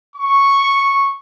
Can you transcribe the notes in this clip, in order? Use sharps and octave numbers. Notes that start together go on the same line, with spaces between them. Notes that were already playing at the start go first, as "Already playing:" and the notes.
C#6